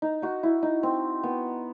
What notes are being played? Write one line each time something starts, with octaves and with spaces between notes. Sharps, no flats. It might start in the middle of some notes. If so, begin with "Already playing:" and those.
D#4
D#4 F#4
E4
D#4
C4
B3